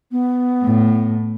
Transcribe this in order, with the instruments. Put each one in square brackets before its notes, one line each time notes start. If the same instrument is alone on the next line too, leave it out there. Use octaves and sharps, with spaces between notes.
[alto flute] B3
[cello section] A2